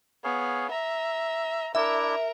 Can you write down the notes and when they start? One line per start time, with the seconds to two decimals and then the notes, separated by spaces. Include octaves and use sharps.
0.24 B3 G#4 C#5 F5
0.71 E5 A#5
1.75 D4 E4 A#4 E5